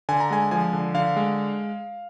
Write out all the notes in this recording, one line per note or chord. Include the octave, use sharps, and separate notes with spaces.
D3 G#5
A#5
G#3 G#5
F3 G#5
D3
D3 F5
G#3